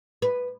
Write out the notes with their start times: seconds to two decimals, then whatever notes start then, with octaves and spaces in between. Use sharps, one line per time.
0.22 B4